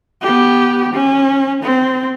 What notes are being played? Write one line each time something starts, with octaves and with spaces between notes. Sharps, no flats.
B3 G4
C#4
C4